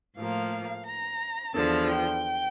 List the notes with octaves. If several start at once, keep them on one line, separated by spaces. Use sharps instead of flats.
A2 F3 A#3 F5
A#5
E2 D3 F3 A5
G5